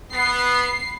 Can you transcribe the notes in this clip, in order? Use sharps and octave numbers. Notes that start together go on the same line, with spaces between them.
B3 C7